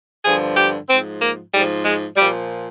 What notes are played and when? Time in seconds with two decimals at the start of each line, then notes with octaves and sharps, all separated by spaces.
0.24 G2 D3 F3 G#4
0.57 G4
0.88 G#2 F3 C4
1.21 A#3
1.53 G#2 F3 G3
1.85 G#3
2.17 A#2 F3 G3